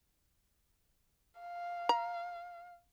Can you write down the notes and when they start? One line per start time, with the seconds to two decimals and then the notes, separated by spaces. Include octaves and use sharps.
1.41 F5
1.89 A#5